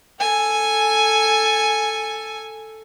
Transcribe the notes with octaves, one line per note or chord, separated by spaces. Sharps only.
A4 G#5